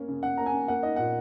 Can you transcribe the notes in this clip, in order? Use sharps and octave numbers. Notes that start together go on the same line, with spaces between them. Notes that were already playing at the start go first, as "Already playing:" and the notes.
Already playing: A#3 C#4 C#5
C#3
C#3 F#5
A#3 A#5
G#5
C#4
A#3 F#5
D#4 D#5
A#2 F#5